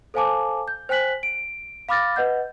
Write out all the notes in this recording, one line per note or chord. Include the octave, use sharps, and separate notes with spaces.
A4 C5 F5 G#5 A5 D6
G6
C5 G5 G#5 F#6 B6 F#7
D7
F5 B5 D6 F6 A6 A#6
B4 D#5 F#5 G6